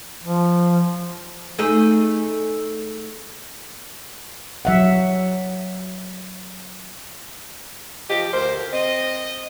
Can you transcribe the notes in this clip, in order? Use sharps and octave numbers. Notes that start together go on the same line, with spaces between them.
F3
A3 D#4 G#4
F#3 E5 F#5
F3 G4 D#5
D2 A#4 C5
C4 D#5